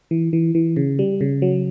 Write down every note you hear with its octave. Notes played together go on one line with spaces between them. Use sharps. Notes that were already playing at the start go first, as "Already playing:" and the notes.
E3
E3
E3
C#3
G3
C#3
F#3